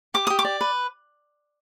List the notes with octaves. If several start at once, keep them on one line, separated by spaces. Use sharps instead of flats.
G4 D6
G4 D#6
D6
D5
B4